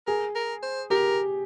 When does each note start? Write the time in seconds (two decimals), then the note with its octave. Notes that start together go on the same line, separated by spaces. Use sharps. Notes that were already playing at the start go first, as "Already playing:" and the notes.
0.07 G#4 A#4
0.35 A#4
0.62 C5
0.90 G4 A#4